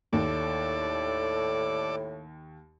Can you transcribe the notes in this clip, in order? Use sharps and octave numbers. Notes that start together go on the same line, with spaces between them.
D#2 A2 A4 D5 D6